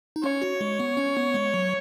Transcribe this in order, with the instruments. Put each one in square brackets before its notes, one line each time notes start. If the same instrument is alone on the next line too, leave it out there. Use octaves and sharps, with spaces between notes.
[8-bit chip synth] D#4
[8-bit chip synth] C#4 [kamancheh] C#5
[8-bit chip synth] F#4
G#3
B3
C#4
B3
G#3
F#3